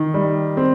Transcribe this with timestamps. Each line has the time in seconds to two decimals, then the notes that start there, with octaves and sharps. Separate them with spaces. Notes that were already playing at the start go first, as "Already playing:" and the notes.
Already playing: D#3
0.14 G3
0.57 C4